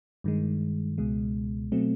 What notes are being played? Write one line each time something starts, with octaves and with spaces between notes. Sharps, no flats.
G2 D#3 G#3
C#2 B2 G#3
B2 F#3 A3 C4